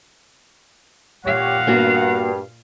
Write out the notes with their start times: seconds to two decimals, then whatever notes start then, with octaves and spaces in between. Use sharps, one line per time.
1.25 A#2 G4 C#5 F5 F#5
1.67 G2 A#3 B3 F#4